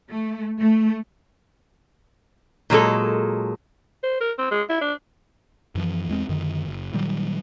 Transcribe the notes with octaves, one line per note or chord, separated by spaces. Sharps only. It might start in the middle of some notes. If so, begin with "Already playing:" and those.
A3
A3
A#2 F#3 G#3 A4
C5
A#4
C4
G#3
E4
D4
F#2 E3 F3
E2 G#3 C4
F#2 D3 D#3
F#1
A#2 D#3 F#3 G3